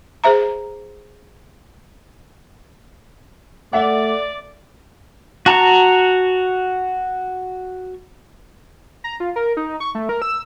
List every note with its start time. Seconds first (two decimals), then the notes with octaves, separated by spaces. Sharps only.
0.24 G#4 C5 E5 A#5
3.73 A3 D5 E5 F#5
5.46 F#4 A5 A#5 C#6
9.04 A#5
9.20 F4
9.36 A#4
9.57 D#4
9.80 C#6
9.95 A3
10.09 A#4
10.22 E6